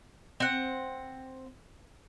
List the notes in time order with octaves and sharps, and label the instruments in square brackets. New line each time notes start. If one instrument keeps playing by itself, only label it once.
[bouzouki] C4 F#5